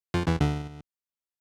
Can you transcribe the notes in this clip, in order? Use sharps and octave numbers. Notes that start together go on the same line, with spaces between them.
F2 F3
E2 E3
D2 D3